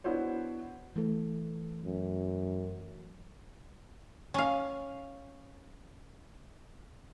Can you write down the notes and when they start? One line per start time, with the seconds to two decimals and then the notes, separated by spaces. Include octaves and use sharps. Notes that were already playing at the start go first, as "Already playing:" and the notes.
0.04 B3 D4 E4 F#4 C5 C#5
0.96 E3 A3 A4
1.82 F#2
4.34 C#4 F5